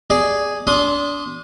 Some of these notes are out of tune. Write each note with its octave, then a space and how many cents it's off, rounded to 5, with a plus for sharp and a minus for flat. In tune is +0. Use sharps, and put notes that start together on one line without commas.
G#4 +0 D5 +0
D4 -30 C6 +0 D#6 +0